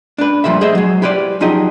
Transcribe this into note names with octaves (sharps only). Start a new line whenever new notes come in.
D4 B4
G2 A#2 F3 G3 C5 E5
G#4 C5 D#5 E5
F#3 G#3
E4 G4 B4 C5 D5
F3 F#3 D#4 G4 G#4 D#5